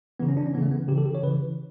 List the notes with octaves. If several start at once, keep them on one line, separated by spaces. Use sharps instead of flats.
C#3 E3 B3
C#4
D4
C#4
C#3 E3 A3 B3
B3
C#3 E3 G4
A4
G4
C#5
C#3 E3 B4